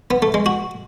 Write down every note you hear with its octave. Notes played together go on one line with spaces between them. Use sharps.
B3
A3
G#3
F#4